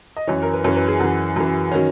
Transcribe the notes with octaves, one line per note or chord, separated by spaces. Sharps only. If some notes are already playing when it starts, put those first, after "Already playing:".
D#5
F#2 E3 C#5
A#4
B4
F#2 E3 C#5
B4
G#4
F#2 E3 F#4
F#2 E3
D#3 F#3 C#4